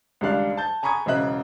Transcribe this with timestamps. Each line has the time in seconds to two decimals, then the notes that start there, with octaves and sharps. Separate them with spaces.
0.21 C#2 D#3 G3 D4 F5 F#6
0.57 A5 G6 A6
0.83 G#5 A#5 B5 C#6 D#6 G#6
1.06 E1 C#3 C5 D#5 E5 F#6